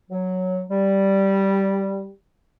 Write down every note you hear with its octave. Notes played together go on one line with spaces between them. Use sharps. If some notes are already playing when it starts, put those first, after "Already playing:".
F#3
G3